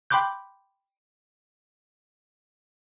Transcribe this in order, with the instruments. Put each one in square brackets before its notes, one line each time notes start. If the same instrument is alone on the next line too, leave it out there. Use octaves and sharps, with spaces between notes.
[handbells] G5 B5 C6 D6 F#6 G6